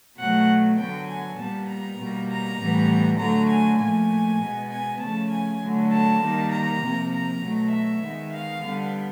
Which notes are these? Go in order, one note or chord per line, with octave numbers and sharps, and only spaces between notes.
B2 F#3 A3 F#5
D3 F#3 B3 G5
G#5
A#2 G3 B3 A5
A#5
B2 G3 A#3
A#5
A2 E3 G3 B3
D3 F#3 A3 A#5
G#5
A#2 F3 A3 G#5
B2 G#3 B3
G#5
C#3 F3 A3 A5
G#5
D3 F#3 A3
A5
D#3 G3 A#3
A#5
C3 F3 A#3
A#5
B2 F#3 A3
E5
D#3 G#3 B3
F5
D3 G3 B3